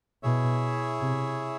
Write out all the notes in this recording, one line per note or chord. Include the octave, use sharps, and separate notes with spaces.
B2 E4 G#4 C#5 E5
C3